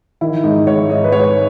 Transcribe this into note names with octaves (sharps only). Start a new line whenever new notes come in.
D#3 E4
G#2 D#4
G#2 C#5
G#2 D#5
B4
G#3 C#5